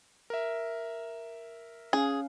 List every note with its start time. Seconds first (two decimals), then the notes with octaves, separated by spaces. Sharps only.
0.30 A#4 E5
1.93 C#4 G#4 F5